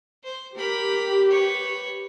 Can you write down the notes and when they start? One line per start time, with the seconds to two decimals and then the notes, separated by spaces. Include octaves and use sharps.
0.24 C5
0.57 G4 A#4 B5
1.31 B4 C#5